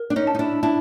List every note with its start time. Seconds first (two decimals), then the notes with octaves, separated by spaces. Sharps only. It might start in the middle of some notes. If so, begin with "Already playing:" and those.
Already playing: A#4
0.10 D4
0.16 C#4 D#4
0.27 A5
0.35 D#4
0.39 D4 E4
0.63 D4 E4 A5